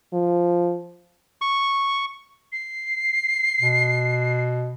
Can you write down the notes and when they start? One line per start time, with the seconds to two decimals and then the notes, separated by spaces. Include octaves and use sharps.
0.13 F3
1.41 C#6
2.52 C7
3.61 B2